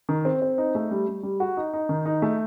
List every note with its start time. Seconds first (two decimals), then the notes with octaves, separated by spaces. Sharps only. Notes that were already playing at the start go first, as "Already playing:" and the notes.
0.09 D#3
0.25 C4
0.42 C4
0.58 D#4
0.75 A3
0.91 G3
1.08 G3
1.23 G3
1.40 F#4
1.57 D#4
1.73 D#4
1.89 D#3
2.06 D#4
2.22 A3